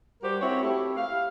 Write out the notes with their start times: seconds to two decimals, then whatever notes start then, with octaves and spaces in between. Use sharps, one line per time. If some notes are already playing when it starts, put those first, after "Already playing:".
0.22 G3 F#4 G4 A#4 C5
0.41 C4 E4 F#4 C5 C#5
0.62 A3 C4 E4 G4
0.96 F5